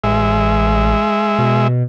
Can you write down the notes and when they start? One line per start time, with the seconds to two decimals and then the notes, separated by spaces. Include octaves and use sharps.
0.04 A1 G#3 E5
1.38 B2